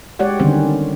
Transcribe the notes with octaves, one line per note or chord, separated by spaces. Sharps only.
G#3 G4 C#5 D5 F#5
D3 D#3 G3 C4 C#4 C5